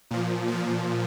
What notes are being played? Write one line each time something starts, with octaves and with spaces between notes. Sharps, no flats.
A#2 F3
A#2 F3